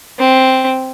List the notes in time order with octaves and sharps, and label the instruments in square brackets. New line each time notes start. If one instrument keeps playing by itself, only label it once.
[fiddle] C4